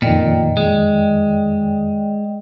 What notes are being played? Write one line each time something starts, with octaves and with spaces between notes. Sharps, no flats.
F2 A#2 D#3 D5 D#5 G5
G#3